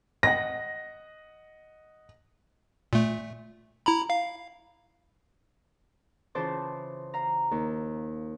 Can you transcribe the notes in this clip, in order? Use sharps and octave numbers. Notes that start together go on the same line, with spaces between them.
D#5 F#5 A#6
A#2 A3
E4 A#5 B5
F5
C#3 E3 F4 C5 A5 D6
F5 A#5
D#2